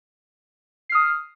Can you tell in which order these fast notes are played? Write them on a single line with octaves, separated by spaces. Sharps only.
C7 F6 D#6